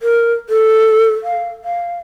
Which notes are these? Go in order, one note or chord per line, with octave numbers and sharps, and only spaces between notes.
A#4
A4
F5
F5